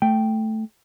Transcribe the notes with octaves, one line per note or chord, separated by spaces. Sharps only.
A3 G5